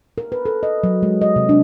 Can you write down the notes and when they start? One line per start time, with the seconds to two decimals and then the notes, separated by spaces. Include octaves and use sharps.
0.18 A#4
0.32 B4
0.45 A4
0.63 D#5
0.84 F#3
1.03 G#3
1.21 D#5
1.36 C3
1.49 D4